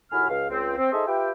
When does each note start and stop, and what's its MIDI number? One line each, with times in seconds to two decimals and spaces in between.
0.12 0.27 39
0.12 0.27 45
0.12 0.27 66
0.12 0.27 80
0.12 0.27 83
0.12 0.27 89
0.29 0.48 37
0.29 0.48 77
0.50 0.76 37
0.50 0.76 60
0.77 0.90 60
0.91 1.03 63
0.91 1.03 68
0.91 1.03 69
0.91 1.03 72
0.91 1.03 75
0.91 1.03 76
1.06 1.31 65
1.06 1.31 67
1.06 1.31 71
1.06 1.31 76
1.06 1.31 79